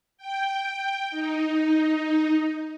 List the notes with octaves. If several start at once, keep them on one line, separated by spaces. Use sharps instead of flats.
G5
D#4